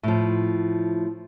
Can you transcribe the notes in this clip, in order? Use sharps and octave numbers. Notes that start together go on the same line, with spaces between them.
A2 F3